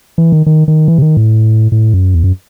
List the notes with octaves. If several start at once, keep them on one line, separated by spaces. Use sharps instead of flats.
E3
D#3
D#3
D#3
E3
C3
D#3
A2
A2
F#2
E2
F#2